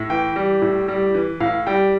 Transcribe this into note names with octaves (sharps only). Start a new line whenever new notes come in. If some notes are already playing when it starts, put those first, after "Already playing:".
Already playing: A2
E3 G5
G3
A2
G3
E3
A2 F5
G3 G5